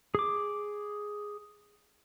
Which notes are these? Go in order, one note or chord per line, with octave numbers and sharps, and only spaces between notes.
G#4 D6